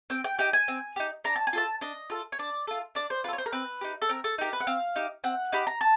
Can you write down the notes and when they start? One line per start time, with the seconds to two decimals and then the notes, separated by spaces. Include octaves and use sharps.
0.10 C4 G5
0.24 G5
0.39 D#4 G4 G5
0.53 G#5
0.68 C4
0.96 D#4 G4
1.24 D4 A#5
1.36 A5
1.47 G#5
1.53 F4 A4 A5
1.81 D4 D#5
2.10 F4 A4
2.32 C#5
2.39 D4 D5
2.67 F4 A4
2.95 D4 D5
3.10 C5
3.24 F4 B4
3.28 A4
3.33 C#5
3.38 C5
3.46 A#4
3.52 C4 B4
3.81 D#4 G4
4.02 A4
4.09 C4 A#4
4.24 A4
4.38 D#4 G4 A#4
4.53 B4
4.60 F#5
4.67 C4 F5
4.96 D#4 G4
5.24 C4 F#5
5.52 D#4 G4 B5
5.67 A#5
5.81 A5